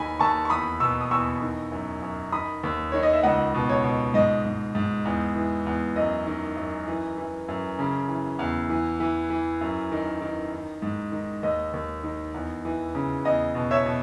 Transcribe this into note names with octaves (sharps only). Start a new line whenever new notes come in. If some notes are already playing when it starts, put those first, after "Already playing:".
Already playing: D#2 D#3 G#5 B5
D#2 A5 C#6
C#6
E2 B5 D#6
B2 C#6 E6
D#6
E2 C#6 E6
D#3
F#2
F#2
D#3 B5 D#6
D#2
D#3 C#5
D#5
E5
C#2 D#5 F#5
B2
C#5
B2
G#2 D#5
G#2
G#2
E2
E3
E2
F#2 D#5
D#3
F#2
E3
E3
F#2
C#3
E3
E2
E3
E3
E3
F#2
D#3
D#3
D#3
G#2
D#3
D#2 D#5
D#2
D#3
E2
E3
C#3
E2 D#5
B2
C#5 E5
B2